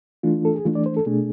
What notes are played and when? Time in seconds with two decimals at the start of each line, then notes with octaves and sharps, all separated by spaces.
0.23 E3 A3 D4 F4
0.45 A4
0.55 G#4
0.65 E3 A3 D4 F4
0.75 D5
0.86 C5
0.97 A4
1.06 B2 A3 D4 G#4